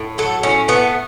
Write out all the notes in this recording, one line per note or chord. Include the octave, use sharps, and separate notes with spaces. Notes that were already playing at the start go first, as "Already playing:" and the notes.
Already playing: A2
F#3 A4
A2 C#4
A3 B3